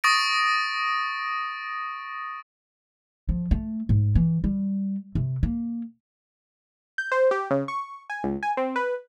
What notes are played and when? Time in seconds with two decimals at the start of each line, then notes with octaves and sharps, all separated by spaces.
0.04 C#6 D#6 A6 A#6 D7
3.29 F3
3.51 A3
3.89 G#2
4.15 E3
4.44 G3
5.15 C3
5.43 A#3
6.98 G6
7.12 C5
7.31 G4
7.51 C#3
7.68 C#6
8.10 G#5
8.24 C#2
8.43 G#5
8.57 C4
8.76 B4